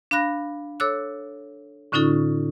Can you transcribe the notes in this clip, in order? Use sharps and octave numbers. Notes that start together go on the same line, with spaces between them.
D4 F5 B5 F#6 A#6
A4 C#5 D6 E6 F#6
A2 D3 C#4 D#4 F4 A4